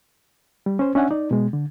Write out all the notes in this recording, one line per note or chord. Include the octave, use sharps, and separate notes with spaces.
G3
C#4 C5
C#4 D4 E5 F#5 G#5
D#4 D5
B2 G#3
D3